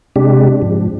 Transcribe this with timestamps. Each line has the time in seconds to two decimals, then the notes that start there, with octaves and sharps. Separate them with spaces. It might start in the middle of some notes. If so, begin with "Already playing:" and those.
0.16 C3 G#3 D4 G4
0.62 G#2 F3